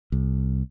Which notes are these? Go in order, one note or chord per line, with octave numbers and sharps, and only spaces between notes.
C2